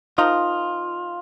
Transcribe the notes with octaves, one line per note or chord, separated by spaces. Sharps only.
F3 D#4 F4 A#4 D#5